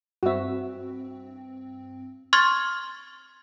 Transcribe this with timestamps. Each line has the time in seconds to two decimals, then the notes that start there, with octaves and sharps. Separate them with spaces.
0.23 G2 C4 F#4 E5
2.33 C6 C#6 F6 G#6 A6